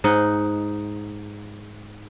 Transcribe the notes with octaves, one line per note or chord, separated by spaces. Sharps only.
G#2 D#4 D#5 F#5